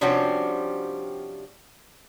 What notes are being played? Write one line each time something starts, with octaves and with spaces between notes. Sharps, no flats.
C3 F3 G3 C#4 D4 F#4